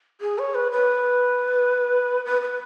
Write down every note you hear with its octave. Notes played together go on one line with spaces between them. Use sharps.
G#4
C#5
B4
B4
B4
B4